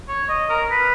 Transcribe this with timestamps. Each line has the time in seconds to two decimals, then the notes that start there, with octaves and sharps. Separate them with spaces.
0.08 C#5
0.29 D#5
0.50 A#4
0.71 B4